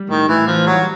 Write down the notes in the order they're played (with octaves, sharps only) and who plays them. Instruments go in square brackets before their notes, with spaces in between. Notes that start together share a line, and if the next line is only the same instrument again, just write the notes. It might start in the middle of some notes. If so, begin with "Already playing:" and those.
Already playing: [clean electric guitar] G3
[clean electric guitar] A2 [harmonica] D#3
[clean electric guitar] A2 [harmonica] E3
[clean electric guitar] E3 [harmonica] F3
[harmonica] F#3 [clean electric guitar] G3